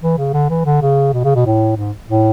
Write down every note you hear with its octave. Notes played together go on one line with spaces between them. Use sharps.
E3
C#3
D3
E3
D3
C#3
B2
C#3
B2
A2
G#2
A2